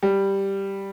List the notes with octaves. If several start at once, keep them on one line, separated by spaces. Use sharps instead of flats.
G3